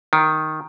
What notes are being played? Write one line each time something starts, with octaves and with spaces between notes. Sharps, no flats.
D#3